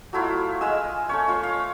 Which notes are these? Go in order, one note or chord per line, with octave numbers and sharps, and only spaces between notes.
F#3 A3 E4 F4
G#3 F5 G#5 E6
A3 C#4 C#5
F4 C#5
F5